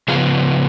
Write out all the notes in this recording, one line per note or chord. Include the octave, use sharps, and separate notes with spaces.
C#3 F3 B3 F4 G#4